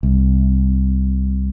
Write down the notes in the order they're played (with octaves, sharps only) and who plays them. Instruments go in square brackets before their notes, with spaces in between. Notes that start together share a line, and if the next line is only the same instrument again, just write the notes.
[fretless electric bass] C2